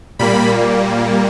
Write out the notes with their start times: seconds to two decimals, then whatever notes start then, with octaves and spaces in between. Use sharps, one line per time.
0.19 A#2 G3 A#3 B5